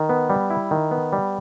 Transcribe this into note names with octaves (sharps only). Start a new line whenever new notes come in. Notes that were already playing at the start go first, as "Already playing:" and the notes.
Already playing: D#3
B3
G3
E4
D#3
B3
G3